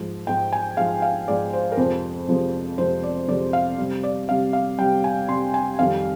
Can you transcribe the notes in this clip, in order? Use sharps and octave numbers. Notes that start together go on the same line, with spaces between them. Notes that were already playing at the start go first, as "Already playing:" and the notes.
Already playing: G#2 F3 G#3
G#2 F3 G#3 G5
G#5
G#2 F3 G#3 F5
F5
G#2 F3 G#3 D5
C5
A#4
F2 C3 F3 G#3 C5
F2 C3 F3 G#3
F2 C3 F3 G#3 C5
D5
F2 C3 F3 G#3 D5
F5
C3 G3
D5
C3 G3 F5
F5
C3 G3 G5
G#5
C3 G3 C6
G#5
F2 D#3 G3 F5